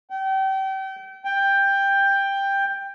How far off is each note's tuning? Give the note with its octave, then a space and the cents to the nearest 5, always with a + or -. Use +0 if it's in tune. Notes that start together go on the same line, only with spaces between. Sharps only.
G5 -35
G5 +10